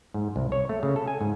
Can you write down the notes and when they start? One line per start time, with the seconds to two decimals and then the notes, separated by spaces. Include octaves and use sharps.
0.14 G#2
0.36 C2
0.52 C#5
0.69 A3
0.83 C#3
0.96 A4
1.08 G#5
1.21 G#2